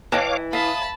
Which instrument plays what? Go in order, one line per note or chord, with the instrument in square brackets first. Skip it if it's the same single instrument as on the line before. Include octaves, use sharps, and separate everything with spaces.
[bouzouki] E3 [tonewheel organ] C#5 F5 D6 [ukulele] D#5 G5 A5
[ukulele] E5 F5 [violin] A5 B5 [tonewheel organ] D#6